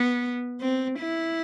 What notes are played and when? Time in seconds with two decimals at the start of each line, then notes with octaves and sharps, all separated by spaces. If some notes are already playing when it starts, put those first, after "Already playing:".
Already playing: B3
0.61 C4
0.99 E4